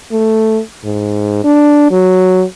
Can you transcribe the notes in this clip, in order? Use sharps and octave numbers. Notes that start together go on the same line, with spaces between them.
A3
G#2
D4
F#3